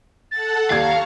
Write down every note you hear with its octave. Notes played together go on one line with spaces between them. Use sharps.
A4 F#5 A5 A6
D#2 D5 F5 A#5 C#6 F6 G#6